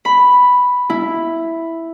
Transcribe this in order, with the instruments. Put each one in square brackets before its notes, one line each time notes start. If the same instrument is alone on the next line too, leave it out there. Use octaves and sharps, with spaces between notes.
[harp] B5
E4